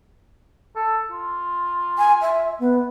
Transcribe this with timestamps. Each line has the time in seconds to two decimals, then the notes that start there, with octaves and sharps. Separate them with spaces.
0.76 A4
1.11 F4
1.98 G#5
2.22 E5
2.59 B3